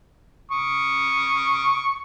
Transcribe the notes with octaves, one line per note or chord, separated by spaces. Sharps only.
C#6 D#6